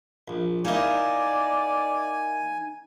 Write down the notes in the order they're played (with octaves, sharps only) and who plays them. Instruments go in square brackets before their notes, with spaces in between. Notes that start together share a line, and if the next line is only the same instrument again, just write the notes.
[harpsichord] A#1
[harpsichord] A#3 E4 [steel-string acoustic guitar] D#4 D#5 [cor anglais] D5 [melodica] G#5